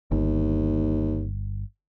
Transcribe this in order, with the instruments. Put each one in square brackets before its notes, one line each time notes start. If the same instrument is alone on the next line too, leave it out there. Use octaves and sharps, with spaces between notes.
[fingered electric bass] G1 [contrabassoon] D#2